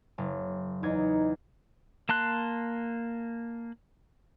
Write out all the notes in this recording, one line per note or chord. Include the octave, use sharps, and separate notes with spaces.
F#1
E2 D#4 G#6
A#3 A5 C6 F#6